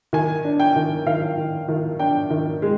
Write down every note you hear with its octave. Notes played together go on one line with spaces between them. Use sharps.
D#3 G#5
D4
G5
D#3
D#3 F5
D#3
D#3
D4 G5
D#3
G#3